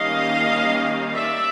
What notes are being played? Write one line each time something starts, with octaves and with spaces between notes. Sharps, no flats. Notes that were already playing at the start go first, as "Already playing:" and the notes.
Already playing: D#3 G3 A#3 C#4 D#5 F5
D5 E5